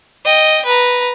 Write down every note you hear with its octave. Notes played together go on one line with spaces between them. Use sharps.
D#5 G5
B4 A#5